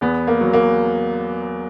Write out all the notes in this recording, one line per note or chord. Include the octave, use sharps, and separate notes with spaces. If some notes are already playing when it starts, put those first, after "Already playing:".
E2 B3
A#3
F#3
A#3